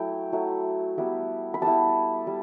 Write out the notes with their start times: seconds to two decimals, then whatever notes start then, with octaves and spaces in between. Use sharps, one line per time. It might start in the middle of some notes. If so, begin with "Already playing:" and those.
Already playing: F#3 A3 E4 G5
0.33 F#3 A3 E4
0.98 G3 B3 E4
1.54 B5
1.62 G3 B3 E4 A5
2.27 G3